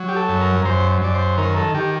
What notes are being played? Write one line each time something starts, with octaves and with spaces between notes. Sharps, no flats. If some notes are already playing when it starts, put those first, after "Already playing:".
Already playing: F#3
G4
A4
F#2
A#4
F#2 C5
F#2 D5
C5
D#3 A#4
A4
D#3 G4